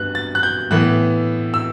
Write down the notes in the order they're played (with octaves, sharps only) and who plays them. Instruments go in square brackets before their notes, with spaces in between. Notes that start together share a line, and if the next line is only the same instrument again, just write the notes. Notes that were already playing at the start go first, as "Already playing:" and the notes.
Already playing: [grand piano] G2 B3 F#6
A6
F#6
G6
A2 E3 B3 F#6
E6